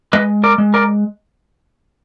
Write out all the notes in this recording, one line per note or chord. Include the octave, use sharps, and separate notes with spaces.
G#3 B4 D#5
A#4 D5
G#3
A#4 D5